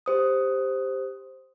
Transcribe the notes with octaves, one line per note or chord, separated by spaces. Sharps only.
G4 C5 D#6